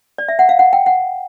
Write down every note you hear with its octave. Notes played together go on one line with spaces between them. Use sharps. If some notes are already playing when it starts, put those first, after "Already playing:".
D5
E5
F#5
F5
F#5
G5
F#5